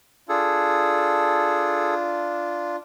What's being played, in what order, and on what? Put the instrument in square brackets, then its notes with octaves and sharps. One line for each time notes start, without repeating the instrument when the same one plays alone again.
[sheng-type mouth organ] D4 F4 [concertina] G#4 A4